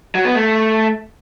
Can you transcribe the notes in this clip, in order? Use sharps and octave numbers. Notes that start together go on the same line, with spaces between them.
F#3
B3
A3